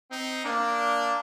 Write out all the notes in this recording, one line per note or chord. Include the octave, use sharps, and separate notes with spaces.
C4 D#4
A#3 D4